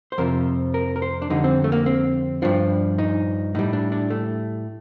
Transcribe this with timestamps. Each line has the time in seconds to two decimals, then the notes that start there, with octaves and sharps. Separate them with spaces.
0.12 C5
0.18 F2 C3 F3 A#4
0.74 A#4
0.96 A#4
1.02 C5
1.22 D4
1.30 F2 D3 G3 D#4
1.44 C4
1.64 A3
1.72 A#3
1.86 C4
2.42 G2 F3 D4
2.98 D#4
3.55 A2 G3 D#4
3.73 D4
3.92 D4
4.10 A3